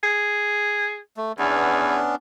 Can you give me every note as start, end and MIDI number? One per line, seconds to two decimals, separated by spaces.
0.03 0.97 68
1.17 1.32 57
1.39 1.97 40
1.39 2.15 59
1.39 2.15 61
1.39 2.15 62